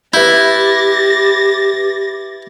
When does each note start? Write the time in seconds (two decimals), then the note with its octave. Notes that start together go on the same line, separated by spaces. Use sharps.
0.14 E4 G4 B4 G6 A6 A#6